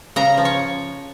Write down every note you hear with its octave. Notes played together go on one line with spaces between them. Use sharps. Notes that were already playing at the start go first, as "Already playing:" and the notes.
C#3 A#5
F3
C#5